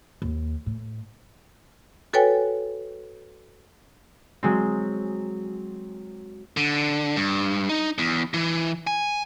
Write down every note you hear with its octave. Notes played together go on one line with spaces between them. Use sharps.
D#2
A2
F#4 A4 B4 C#5 G5 G#5
F#3 G#3 C4
D3
G2
D#4
E2
E3
G#5